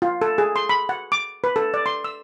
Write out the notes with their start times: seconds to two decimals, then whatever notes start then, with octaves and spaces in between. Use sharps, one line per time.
0.02 F4
0.22 A4
0.38 G#4
0.56 C6
0.69 B5
0.89 F#5
1.12 D6
1.44 B4
1.56 A4
1.74 D5
1.86 C6
2.04 E6